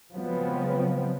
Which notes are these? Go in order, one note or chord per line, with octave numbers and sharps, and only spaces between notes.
C#3 F3 F#3 G#3 B3 C4